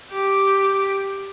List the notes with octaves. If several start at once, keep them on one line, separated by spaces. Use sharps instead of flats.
G4